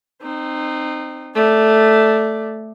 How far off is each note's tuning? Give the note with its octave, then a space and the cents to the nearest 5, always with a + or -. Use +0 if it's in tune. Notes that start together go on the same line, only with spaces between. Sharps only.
C4 +0 D#4 -25
A3 +0 D5 +0